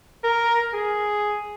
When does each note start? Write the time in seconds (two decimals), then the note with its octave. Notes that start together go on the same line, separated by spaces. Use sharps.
0.24 A#4
0.74 G#4